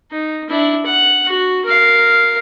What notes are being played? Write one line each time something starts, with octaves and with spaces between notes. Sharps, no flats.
D#4
D4 E4
F#5
F#4
A#4 F5